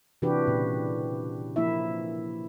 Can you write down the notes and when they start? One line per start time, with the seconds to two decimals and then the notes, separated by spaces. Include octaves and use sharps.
0.22 C3 E3 D4 F#4 G4 B4
0.47 A#2 C#3
1.56 F3 A#3 E4 E5